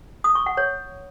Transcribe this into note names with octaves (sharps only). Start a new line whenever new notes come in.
D#6
C#6
F#5
C#5